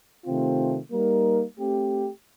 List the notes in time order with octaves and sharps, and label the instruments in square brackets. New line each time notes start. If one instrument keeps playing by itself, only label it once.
[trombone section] C3 D#3 A3 C4 F4
G3 A#3 D#4 A#4
A3 C4 G4